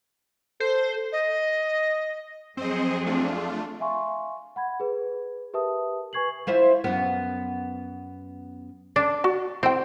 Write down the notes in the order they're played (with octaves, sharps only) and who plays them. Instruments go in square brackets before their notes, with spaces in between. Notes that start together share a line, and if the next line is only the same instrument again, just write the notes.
[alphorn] A4 [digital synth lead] C5
[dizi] D#5
[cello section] F2 F#3 G#4 [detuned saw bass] C4 [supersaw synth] C5 D#5
[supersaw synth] A3 D4 F4
[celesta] E5 F5 G#5 C6 C#6
F#5 B5 G#6
G#4 B4
G4 A#4 B4 E5 A5 D#6
B4 G#5 C#6 G#6 C7 F#7
[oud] E4 F4 C5
F#2 B3
[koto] D4
[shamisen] F#4
[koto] C4 [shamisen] E4 G5